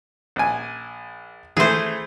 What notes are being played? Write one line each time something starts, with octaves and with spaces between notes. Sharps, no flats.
A#1 G#5
E3 A3 G#4 C5